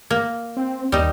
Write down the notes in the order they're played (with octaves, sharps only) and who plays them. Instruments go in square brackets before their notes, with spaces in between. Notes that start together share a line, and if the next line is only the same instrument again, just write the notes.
[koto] A#3
[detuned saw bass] C4
[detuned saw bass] D#2 [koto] G3 D#4